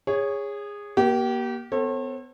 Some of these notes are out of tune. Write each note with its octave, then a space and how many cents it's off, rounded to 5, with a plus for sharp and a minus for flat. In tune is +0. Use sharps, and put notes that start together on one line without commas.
G#4 -20 C#5 +0
A#3 +30 G4 -30
B3 +35 A4 +20 C#5 -45